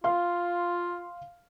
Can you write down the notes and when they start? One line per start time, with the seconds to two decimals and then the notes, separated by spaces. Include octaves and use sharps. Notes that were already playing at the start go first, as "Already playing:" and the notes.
0.04 F4 F5 C6